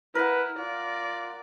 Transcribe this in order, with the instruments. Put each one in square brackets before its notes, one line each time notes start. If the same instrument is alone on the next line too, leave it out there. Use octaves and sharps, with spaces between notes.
[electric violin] E4 [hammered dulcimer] A#4 F#5 [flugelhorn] B4
[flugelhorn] F4 [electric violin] D5